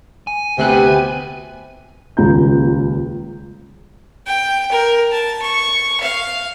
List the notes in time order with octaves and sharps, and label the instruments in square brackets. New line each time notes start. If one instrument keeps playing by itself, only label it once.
[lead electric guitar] G#5
[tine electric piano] D2 F#6 [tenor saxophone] C3 [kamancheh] B3 G4
[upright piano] D#1 C#2 C#3 A#5 G6
[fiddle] G5
A#4
A5
C#6
F5